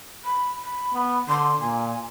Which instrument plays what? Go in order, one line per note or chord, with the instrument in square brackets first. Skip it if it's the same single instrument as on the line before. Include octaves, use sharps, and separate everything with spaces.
[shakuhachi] B5
B5
[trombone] B3
[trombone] D3 [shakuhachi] C6
[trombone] A#2 [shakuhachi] G#5